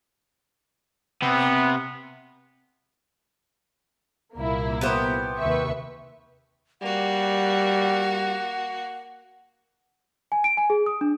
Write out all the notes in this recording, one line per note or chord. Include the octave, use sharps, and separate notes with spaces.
C3 B3
C2 A#2 A#3 E4
B3 G4 C5
D#2 C3 B4 E5 C#6
G3 A#3 F#4 F#5
G#5
D7
G#5
G#4
D#6
D4